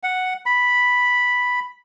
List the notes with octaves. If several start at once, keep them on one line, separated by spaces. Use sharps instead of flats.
F#5
B5